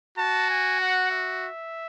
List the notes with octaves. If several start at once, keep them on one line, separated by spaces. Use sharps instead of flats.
F#4 A5
G#5
F#5
E5